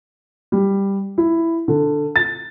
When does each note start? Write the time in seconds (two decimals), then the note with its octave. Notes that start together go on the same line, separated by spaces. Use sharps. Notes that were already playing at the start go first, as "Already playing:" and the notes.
0.52 G3
1.18 E4
1.68 D3
2.16 A6